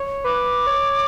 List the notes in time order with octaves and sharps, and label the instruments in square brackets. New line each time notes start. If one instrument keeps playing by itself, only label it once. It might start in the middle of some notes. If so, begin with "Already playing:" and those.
Already playing: [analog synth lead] C#5
[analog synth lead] B4 [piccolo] D6
[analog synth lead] C#5